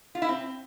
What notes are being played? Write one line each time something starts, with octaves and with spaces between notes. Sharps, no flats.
F4
E4
C4